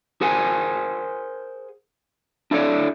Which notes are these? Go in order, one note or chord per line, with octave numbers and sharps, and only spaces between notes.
G#4 A#4 C5 F#5 G#5
D4 E4 A4 C#5 D5